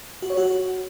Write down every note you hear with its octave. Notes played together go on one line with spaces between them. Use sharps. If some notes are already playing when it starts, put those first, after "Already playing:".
F#4
C#5
F#4